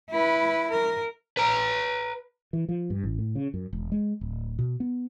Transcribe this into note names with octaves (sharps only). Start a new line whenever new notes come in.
E4 B4
A#4
B4 A#5
E3
F3
G2
A1
A2
C#3
F#2
E1
G#3
D1
B2
B3